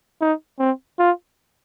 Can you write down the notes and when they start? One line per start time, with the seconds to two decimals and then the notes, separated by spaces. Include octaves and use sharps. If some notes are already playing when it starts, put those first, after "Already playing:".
0.21 D#4
0.59 C4
0.99 F4